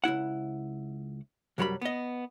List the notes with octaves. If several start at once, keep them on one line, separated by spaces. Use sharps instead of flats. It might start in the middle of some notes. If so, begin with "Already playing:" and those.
C#2 F#2 E4 F#5
C2 F#2 F#3 G3 A#4 B5
B3 D#5